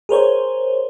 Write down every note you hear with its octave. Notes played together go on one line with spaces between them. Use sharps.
G#4 A#4 C5 C#5